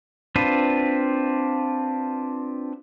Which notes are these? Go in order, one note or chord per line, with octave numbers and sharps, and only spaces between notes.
C4 D4 F4 B4